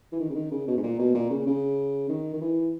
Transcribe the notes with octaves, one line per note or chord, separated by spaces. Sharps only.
E3
D#3
C#3
D#3
C#3
B2
G#2
A#2
B2
A#2
C#3
C#3
D#3
D#3
E3